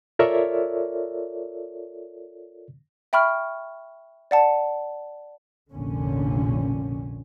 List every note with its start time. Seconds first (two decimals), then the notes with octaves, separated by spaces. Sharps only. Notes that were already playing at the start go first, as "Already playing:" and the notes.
0.19 F4 A4 A#4 C#5 D5 E5
3.13 E5 G5 B5 C#6 F6
4.31 D5 F#5 A5
5.70 F1 A#1 A#2 D3 C#4